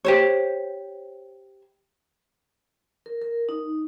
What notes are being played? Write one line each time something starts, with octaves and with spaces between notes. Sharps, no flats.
G4 C5 C#5
A#4
A#4
D#4